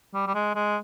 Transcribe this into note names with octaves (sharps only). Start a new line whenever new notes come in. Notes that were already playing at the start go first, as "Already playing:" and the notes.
G3
G3
G#3
G#3